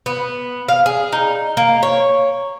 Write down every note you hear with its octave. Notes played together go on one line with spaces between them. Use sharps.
B3
F5
G#4
D#4
A#3
C#5